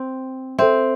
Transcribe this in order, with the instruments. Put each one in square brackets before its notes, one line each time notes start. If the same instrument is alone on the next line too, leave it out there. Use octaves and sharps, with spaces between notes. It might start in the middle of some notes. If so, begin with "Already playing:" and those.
Already playing: [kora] C4
[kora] C4 [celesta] A4 C5 E5